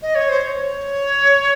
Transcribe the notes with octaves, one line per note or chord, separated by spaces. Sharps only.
D#5
C#5
C5
C#5